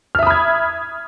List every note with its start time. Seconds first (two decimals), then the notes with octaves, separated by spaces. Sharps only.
0.15 F6
0.19 E5
0.23 D#6
0.26 B5
0.30 G#6